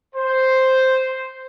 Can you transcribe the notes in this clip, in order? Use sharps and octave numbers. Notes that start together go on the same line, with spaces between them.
C5